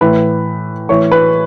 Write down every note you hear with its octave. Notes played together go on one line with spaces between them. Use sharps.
A2 E3 B4 B5
A2 E3 C#5 C#6
B4 B5